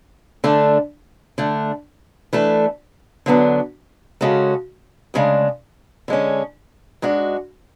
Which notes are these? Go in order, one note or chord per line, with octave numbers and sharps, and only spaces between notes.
D3 A3 D4 A4
D3 A3 D4
E3 A3 D4 A4
D3 F#3 B3 D4
C#3 G#3 C#4 F#4 A4
D2 C#3 G#3 D4
D3 G#3 C#4
G#2 G#3 D4 F#4